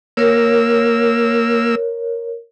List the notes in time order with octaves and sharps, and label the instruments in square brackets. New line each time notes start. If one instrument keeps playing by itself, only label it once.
[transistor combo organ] A#3 E6 [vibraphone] A#4 C#5